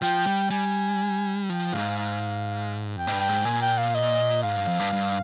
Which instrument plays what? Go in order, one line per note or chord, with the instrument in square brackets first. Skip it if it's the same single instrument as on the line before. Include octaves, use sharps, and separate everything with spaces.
[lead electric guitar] F3 [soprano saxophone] G5
[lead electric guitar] G3
[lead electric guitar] G3 [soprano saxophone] G#5
[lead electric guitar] F3 [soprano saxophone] G5
[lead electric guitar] G#2 [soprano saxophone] F5
[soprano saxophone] F5
[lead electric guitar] F2 [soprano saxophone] G5
[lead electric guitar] G#2
G2
[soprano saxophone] G5
[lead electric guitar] G#2
[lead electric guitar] A#2 [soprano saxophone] G#5
[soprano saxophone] G5
F5
D#5
[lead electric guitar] G#2 [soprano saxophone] F5
[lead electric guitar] G2
F2
G2
G2